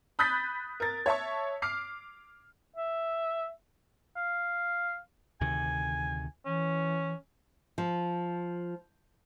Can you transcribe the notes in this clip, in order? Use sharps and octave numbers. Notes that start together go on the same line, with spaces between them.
B5 D#6 F#6 G6 A6 B6
A#4 A6
C#5 E5 A5 C#6
D6 F6 C7
E5
F5
D2 C3 D#3 G#5
E3 C#4
F3